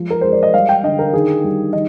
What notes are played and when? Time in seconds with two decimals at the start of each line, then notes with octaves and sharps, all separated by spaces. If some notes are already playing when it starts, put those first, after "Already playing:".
Already playing: F3 G#3
0.10 A#4
0.21 G#3 C5
0.32 D5
0.43 D#5
0.54 G3 F5
0.69 G5
0.83 D3 D#5
0.99 A#4
1.13 D#3 G#4
1.44 G3
1.73 D#3 D#5